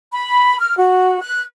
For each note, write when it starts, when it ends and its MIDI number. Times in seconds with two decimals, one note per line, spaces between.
0.12 0.58 83
0.59 0.76 89
0.77 1.21 66
1.21 1.41 90